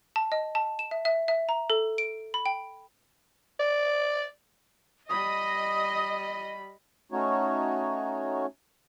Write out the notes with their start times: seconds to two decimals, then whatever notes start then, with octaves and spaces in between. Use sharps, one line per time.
0.16 A5
0.32 D#5
0.55 A5
0.79 E7
0.91 E5
1.05 E5
1.28 E5
1.49 A#5
1.70 A4
1.98 D7
2.34 B5
2.46 G5
3.59 D5
5.09 G3 D#5 B5 D#6
7.12 A3 C#4 D#4 F#4 C#5